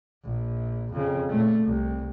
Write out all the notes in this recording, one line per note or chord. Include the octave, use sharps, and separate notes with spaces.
A#1
F2 C#3
A#2 A3
C2